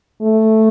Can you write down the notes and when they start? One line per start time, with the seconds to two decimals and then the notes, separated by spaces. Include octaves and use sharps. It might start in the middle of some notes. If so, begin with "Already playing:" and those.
0.21 A3